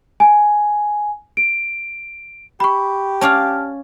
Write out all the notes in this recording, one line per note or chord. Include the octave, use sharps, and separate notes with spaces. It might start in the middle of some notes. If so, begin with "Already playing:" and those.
G#5
D7
G4 B5 C#6
C#4 D5 F5 A5 F6